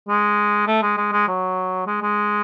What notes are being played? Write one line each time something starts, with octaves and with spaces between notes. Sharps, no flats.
G#3
A3
G#3
G#3
G#3
F#3
G#3
G#3